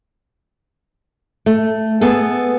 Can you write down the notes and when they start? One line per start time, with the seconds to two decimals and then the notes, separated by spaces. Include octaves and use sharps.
1.46 A3
2.01 B3 G#4 A4